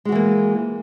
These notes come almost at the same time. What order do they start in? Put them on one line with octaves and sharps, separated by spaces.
G#3 F#4 E3 A#3